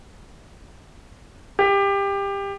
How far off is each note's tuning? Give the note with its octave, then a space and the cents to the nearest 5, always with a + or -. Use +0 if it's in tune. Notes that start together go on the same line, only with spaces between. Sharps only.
G4 +20